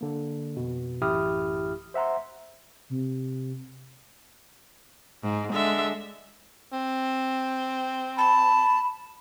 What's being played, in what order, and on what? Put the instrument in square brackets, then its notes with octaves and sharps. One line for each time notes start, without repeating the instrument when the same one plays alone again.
[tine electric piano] D3 A#3
F2 B2
A1 F#2 E4 G4 D#6 F6
C5 E5 F#5 A#5 C6
[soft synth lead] C3
[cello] G#2
[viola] D3 E5 [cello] G#3
[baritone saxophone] C4
[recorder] A5 [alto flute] B5